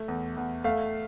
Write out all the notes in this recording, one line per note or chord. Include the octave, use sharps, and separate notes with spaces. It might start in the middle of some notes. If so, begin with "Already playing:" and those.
Already playing: A3
E2
E2
A3 F5